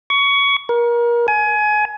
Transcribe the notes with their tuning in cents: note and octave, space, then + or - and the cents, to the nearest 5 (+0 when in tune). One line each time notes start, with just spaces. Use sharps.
C#6 +20
A#4 +30
G#5 +25